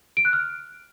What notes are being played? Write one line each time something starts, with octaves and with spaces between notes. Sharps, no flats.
D7
F#6
F6